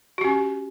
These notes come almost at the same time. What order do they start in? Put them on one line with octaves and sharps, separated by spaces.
F#4 G4 C#4